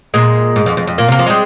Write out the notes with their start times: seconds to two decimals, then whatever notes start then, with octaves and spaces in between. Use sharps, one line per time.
0.14 A#2 G#3
0.56 G#2
0.66 F2
0.77 F2
0.87 F2
0.98 A#2 A#3
1.08 C3 A#3
1.19 F3
1.27 G3 G#3